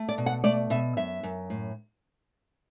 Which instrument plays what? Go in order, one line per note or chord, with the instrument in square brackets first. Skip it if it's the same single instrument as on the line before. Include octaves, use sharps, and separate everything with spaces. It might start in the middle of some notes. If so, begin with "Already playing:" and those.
Already playing: [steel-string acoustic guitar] A3
D5
B2
F#5
A3 D5
B2 E5
F#2 E5
F#2
A2